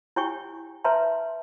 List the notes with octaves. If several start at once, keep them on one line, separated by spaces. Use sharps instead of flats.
E4 G4 C#5 G5 G#5 C#6
B4 C#5 E5 A5 A#5 C6